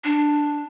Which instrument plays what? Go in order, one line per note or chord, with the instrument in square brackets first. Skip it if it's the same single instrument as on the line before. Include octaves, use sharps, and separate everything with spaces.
[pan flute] D4